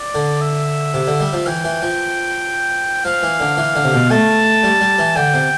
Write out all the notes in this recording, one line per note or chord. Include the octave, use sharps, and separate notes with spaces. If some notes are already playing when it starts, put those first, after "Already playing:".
Already playing: D5
D3
E5
C3
D3
G3
F3
E3 G5
E3
F3
F3 F5
E3
D3
E3
D3
C3
B2
A3 A5
G3
G3
E3
D3 G5
C3